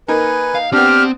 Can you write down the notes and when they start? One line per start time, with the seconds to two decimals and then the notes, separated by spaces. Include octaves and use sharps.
0.08 A#3 D#4 A#4 B4 G#5
0.55 F5
0.73 B3 C4 D4 G4 F6